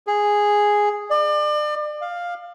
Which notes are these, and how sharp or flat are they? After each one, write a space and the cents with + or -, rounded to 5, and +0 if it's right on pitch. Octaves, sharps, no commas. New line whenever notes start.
G#4 -5
D5 +35
F5 +5